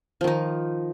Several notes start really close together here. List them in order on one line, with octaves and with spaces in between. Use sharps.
F3 D#3 D#4